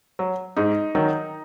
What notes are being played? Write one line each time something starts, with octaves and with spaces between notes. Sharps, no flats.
F#3
G#2 D#4
D#3 F#3